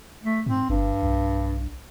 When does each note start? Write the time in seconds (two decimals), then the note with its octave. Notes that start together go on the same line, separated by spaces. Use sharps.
0.23 A3
0.46 G#2 C4
0.69 G1 G2
1.03 B1